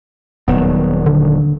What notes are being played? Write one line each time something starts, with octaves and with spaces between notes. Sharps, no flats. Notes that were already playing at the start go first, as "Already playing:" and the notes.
D#1 D#3 F#3 B3
D3